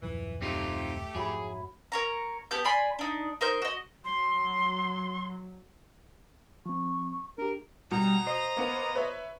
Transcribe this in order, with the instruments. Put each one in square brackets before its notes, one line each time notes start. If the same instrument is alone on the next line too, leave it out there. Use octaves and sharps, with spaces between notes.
[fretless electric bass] D#1 F#2 F3 [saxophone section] E3
[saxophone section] A3 G4 [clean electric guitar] C4 D#4 F4
[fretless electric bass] F2 G#2 [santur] F#3 E4 B5 [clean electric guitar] G#4
[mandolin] A#4 C#5 A#5
B3 G4 A5 G6
D5 G#5 B5 C6
D4 D#4
D#4 A#4 C5 G6
F#4 D#5
[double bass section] F#3 [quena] C6
[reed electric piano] F3 C4 [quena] C#6
[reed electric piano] D4 G4 [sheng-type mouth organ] A#4
[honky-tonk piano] B2 [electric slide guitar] G3 [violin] A#5
[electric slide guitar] C5 [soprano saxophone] D#5
[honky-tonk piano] A#3 B3
B4 C#5 E5